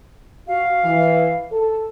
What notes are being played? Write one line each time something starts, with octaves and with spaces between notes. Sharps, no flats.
F#4 F5
E3
A4